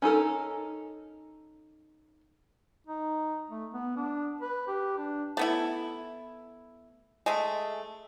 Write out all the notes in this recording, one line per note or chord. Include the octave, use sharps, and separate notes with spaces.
C#4 D#4 A4 A#4
D#4
A3
B3
D4
B4
G4
D4
A3 B3 E4
G#3 A3 E5